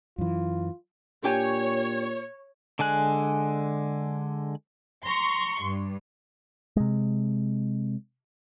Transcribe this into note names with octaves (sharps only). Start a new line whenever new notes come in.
F#2 E3 F4
A#2 D4 G4 C#5 G#5
D3 G#3 G#5 F#6
A#5 C6 C#6
G2
C3 G#3